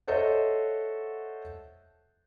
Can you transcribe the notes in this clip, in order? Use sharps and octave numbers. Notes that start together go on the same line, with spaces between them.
A4 C5 C#5 D#5 E5 F#5